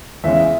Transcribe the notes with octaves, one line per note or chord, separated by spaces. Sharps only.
E2 C#3 E3 G#3 C#4 E5